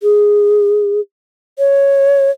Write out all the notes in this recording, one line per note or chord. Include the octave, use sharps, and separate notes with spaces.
G#4
C#5